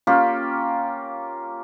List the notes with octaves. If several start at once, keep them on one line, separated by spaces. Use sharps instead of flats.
A#3 C#4 F4 G4